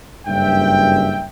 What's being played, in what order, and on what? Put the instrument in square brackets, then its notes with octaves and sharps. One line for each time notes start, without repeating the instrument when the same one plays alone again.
[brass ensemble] F#1 G2 E5 G5